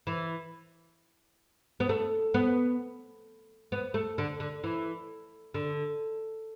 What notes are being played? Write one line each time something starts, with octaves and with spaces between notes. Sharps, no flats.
E3
B3
A3
B3
B3
A3
D3
D3
E3
D3